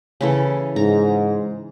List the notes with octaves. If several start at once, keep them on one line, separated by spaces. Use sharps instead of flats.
C#3 E3 A4
G#2 A#5